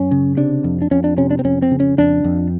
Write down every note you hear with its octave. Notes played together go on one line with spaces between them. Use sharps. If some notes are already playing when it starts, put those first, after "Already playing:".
Already playing: F#2 C#4
C#3
C3 D4
F2
D4
F2 C#4
D4
C3 C#4
D4
C4
F2 C#4
C4
C#3
C#4
F2 D4
F2